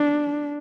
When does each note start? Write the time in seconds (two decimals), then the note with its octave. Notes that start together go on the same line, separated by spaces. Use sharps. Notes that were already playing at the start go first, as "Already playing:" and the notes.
Already playing: D4